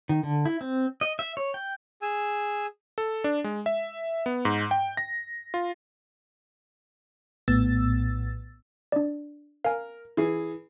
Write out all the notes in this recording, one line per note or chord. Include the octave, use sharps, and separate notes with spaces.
D#3
D3
E4
C4
D#5
E5
C#5
G5
G#4 G#5 E6
A4
D4
G#3
E5
B3
G#2
G5
A#6
F4
A#1 A2 B3 E6 A6
D4 D5
A#4 F5 G#5
E3 G#4